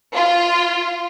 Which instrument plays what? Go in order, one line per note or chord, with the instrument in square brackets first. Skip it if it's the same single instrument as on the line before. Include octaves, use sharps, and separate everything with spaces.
[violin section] F4